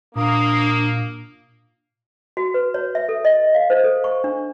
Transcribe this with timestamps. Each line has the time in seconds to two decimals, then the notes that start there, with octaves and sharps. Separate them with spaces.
0.15 A#2 A#3 D4 D#6
2.37 F#4
2.54 B4
2.74 C#5
2.95 E5
3.09 A4
3.25 D#5
3.55 F5
3.70 C5
3.84 A4
4.04 C#6
4.24 D4